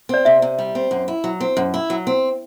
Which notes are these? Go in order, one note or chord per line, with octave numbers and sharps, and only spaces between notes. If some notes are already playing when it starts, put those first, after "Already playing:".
C4 D5
C3 E5
C3
G3
C4
F#2
E4
F#3
C4
F#2
E4
F#3
C4